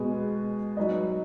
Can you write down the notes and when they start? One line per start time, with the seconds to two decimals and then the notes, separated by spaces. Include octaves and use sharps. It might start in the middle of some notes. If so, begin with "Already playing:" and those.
Already playing: B2 G#3 B3 G#4
0.77 F#3 D#4 B4 D#5